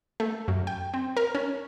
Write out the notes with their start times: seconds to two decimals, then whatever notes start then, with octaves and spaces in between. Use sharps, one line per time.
0.20 A3
0.48 F#2
0.67 G5
0.94 C4
1.17 A#4
1.35 C#4